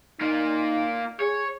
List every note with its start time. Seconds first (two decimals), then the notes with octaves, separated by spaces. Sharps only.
0.21 A#3 D#4 F4
1.20 G#4 C#5